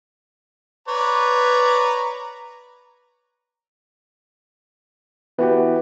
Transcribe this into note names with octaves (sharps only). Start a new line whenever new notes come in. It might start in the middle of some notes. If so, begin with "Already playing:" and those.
B4 C#5 D5 A#5
E3 B3 F#4 G4